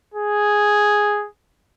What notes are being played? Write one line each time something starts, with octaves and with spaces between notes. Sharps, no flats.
G#4